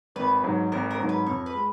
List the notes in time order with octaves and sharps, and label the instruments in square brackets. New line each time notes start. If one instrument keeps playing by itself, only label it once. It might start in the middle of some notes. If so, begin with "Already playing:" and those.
[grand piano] G#1 [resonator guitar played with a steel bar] B4
[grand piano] G#2 F#3
[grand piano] G#1 [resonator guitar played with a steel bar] A#4
[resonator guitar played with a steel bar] A#4
[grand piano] G#2 F#3
[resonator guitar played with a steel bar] B4
[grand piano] F2 [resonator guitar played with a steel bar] C#5
[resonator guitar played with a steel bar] B4
[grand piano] G#3